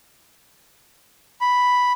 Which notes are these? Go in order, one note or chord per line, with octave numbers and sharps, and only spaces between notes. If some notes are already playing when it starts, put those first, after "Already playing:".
B5